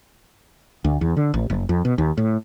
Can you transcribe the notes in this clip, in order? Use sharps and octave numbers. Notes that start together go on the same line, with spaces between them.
D2
E2
D3
A1
F#1
F2
B2
D#2
A2